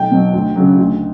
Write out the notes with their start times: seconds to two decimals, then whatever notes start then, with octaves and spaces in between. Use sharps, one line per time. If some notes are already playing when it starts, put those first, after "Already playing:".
Already playing: B1 G5
0.11 B2 F#3
0.33 D2
0.56 C#3 F#3
0.78 D2